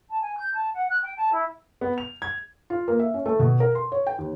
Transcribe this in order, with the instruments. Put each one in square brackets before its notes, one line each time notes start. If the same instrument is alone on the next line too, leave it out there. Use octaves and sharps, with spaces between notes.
[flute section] A5
G#5
G6
A5
F#5
F#6
G5
A5
E4
[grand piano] B3
F7
G#6
[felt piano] F4
A#3
E5
C#4
A3
B2
A#4
C6
C#5
G5
D#2